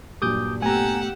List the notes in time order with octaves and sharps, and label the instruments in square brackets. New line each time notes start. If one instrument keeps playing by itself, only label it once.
[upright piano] G2 A#2 F#3 [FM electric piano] G4 [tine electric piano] D6 D#6 G6
[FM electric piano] A3 B3 [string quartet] G4 F#5 E6 [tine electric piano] G#5 A#5